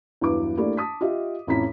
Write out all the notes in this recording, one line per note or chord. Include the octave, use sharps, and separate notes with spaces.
E2 G2 F#3 E4 B4 D6
A3 A#3 D4 E4 G4
A5 D#6 B6
F4 G4 D#5 E5
A1 F2 C#4 E4 A#5 B6